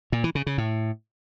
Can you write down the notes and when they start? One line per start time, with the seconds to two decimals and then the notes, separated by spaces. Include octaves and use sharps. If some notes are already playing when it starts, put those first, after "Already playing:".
0.12 A#2
0.24 E3
0.35 C#3
0.47 C#3
0.58 A2